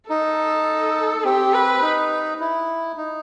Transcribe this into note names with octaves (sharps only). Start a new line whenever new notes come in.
D#4 A4
C4 G4
B4
D#4
E4
D#4